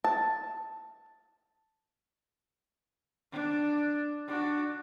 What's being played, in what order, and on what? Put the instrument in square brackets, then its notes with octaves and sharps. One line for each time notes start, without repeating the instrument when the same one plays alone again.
[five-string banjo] A5
[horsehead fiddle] D4
D4 F#4